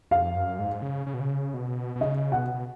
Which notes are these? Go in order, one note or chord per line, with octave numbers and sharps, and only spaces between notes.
F2 F5
F#2
G#2
C#3
C#3
B2
C#3
B2
B2
C#3 D#5
B2 F#5
B2